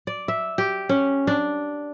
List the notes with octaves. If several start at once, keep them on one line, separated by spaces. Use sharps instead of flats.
D5
E5
G4
C#4
D4